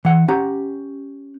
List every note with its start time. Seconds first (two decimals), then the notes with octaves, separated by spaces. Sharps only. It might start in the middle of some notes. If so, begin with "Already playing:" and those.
0.05 E3 F#5
0.28 C#4 G4 F#5 A#5